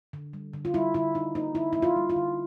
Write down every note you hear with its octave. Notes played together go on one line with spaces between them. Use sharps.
D3
G3
D3
F4
G3 E4
D3 E4
D3 D#4
A#3 D#4
D3 E4
A#3 E4
F4
G3
F4
D3